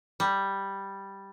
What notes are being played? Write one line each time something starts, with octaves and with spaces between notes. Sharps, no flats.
G3